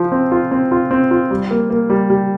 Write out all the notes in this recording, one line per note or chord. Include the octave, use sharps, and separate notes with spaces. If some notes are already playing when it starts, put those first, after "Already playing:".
Already playing: F3 C5
C4
F4
C4
F4
C4
F4
G3
A#3
A#3
G3
G3